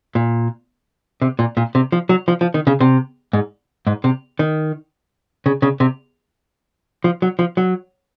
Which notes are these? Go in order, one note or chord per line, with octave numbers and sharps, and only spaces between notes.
A#2
C3
A#2
A#2
C3
F3
F#3
F3
F3
D#3
C#3
C3
G#2
G#2
C3
D#3
C#3
C#3
C3
F3
F#3
F3
F#3